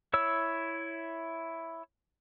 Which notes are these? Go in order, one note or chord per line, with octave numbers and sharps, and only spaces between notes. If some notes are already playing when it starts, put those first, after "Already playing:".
E4 C#5 E6